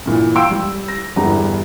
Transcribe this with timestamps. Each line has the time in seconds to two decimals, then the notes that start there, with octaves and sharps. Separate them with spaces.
0.06 G2 A#2 E3
0.35 F5 G5 C6 E6 D7
0.50 G3
0.88 A#6
1.16 G1 E2 G2 G3 A#5